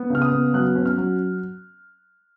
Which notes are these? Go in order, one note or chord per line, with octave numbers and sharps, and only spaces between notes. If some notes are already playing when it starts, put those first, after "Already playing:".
Already playing: B3
C#3 F6
D#6
B3
F#3 F#6
C#4
F6
F#3